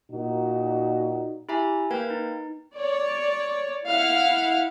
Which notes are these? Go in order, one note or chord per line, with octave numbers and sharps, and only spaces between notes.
A#2 D#4 F#4
E4 G4 E5 G#5 A#5
A#3 A#4 B4 G5 G#6
D#4
C#5 D5
E4 F5 F#5